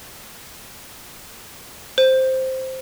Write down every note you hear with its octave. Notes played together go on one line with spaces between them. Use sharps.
C5